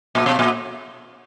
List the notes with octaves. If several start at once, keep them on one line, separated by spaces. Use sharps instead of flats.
A#2
B2
A#2